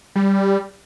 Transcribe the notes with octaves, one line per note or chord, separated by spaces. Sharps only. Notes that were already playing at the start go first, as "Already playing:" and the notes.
G3